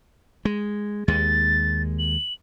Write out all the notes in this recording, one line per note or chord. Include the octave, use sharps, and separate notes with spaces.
G#3
D#2 G#3 A6
F#7